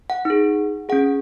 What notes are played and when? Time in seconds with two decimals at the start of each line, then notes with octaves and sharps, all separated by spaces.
0.10 F#5
0.25 D#4 G#4
0.89 C#4 G#4 F#5